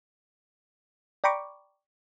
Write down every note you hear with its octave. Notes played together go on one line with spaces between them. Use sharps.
D5 G5 A#5 B5 C#6 D6